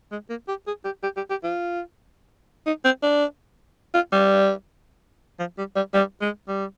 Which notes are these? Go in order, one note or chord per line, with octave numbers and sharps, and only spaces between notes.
G#3
A#3
G4
G#4
G4
G4
G4
G4
F4
D#4
C4
D4
F4
G3
F3
G3
G3
G3
G#3
G3